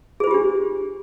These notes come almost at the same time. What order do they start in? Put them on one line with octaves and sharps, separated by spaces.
G#4 C5 F4 G4 D4